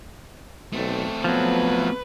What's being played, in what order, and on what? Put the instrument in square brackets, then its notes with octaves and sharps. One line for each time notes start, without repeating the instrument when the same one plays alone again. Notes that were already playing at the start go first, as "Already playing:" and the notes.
[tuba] B1 [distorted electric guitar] A3 C4
[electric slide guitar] F3 F#3 [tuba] B3 [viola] B4